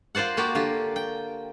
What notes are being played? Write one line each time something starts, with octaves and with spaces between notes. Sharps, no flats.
F4 A#4 C5 D5 F#5
A#3 F#4 G4 A#4 D5
D3 F4 G4
G5